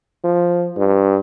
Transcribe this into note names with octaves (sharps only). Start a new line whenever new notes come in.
F3
G2